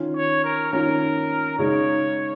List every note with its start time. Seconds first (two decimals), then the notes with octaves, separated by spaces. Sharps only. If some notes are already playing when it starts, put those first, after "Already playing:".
Already playing: D#3 C#4 F4
0.16 C#5
0.44 A#4
0.73 D#3 C#4 F4 A#4
1.59 C#3 G#3 D#4 C#5